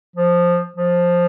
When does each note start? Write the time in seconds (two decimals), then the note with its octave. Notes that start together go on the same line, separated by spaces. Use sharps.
0.16 F3
0.77 F3